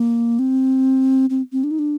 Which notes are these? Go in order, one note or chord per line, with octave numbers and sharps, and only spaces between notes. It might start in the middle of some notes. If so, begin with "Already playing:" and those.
Already playing: A#3
C4
C4
C4
D4
D#4
D4